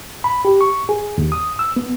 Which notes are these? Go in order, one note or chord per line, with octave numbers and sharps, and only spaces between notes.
B5
G4
C#6
G#4
D#2
D#6
E6
B3